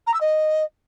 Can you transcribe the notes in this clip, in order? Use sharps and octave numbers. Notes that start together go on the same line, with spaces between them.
A#5
E6
D#5